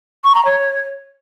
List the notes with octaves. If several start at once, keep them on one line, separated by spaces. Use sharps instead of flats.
C#6
A#5
C#5